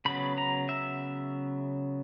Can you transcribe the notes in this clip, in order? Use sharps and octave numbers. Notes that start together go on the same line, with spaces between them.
C#3 F#3 B3 B5
A#5
E5